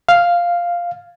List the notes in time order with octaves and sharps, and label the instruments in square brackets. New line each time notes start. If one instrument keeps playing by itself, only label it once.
[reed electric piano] F5